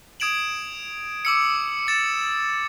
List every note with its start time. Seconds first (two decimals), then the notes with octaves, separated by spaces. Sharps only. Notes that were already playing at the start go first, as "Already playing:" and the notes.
0.20 D#6 G#6 D7 E7 F#7
1.25 D6 E6 C#7
1.87 D6 A6 E7